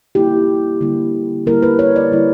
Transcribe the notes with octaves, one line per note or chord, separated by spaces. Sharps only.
D3 G3 A#3 E4 G4
D3 G3 A#3 E4
D3 G3 A#3 E4 A#4
B4
C#5
D5
D3 G3 A#3 E4